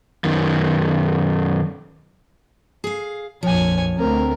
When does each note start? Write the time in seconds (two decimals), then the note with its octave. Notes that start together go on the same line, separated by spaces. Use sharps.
0.24 F#2 D#3
2.84 G#4 F5
3.43 A#1 F2 F3 C#5 G#5
3.98 D2 A3 C4 A#4